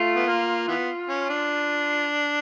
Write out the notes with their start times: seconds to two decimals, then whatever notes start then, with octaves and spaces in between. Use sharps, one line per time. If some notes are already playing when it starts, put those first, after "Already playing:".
Already playing: A3 F4
0.16 B3
0.27 A#3
0.68 E3 B3
1.09 C#4
1.29 D4